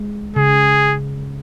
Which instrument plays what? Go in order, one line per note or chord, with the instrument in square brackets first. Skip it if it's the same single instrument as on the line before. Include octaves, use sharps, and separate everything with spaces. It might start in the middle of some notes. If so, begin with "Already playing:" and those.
Already playing: [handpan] G#3
[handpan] C#3 [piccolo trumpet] G#4